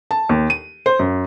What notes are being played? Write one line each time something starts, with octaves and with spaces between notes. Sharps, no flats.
A5
D#2
D#7
C5
F#2